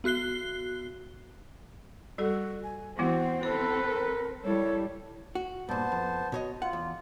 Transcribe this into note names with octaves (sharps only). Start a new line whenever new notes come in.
B3 F#4 F#6 C7 G7
G3 F#4 A4
G#5
E3 B3 C4 E4 F#4 F#5
E4 A4 B4 C5
A#4
G3 E4 A4 C#5
F#4
G2 A#2 B3 C5 A5
F2
B2 C#5 D#5
F4 F#5
E2